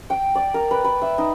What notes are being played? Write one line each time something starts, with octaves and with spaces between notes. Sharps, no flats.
G5
D5
A#4
B4
B4
E5
D#4